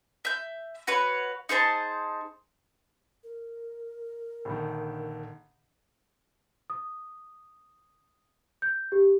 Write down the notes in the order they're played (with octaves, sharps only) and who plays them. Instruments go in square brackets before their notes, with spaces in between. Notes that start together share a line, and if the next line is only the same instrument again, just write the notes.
[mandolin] E5 G6
F#4 B4 C#5
D#4 G#4 C5 A5
[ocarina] A#4
[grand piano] A#1 D3 D#3
[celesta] D#6
G6
G4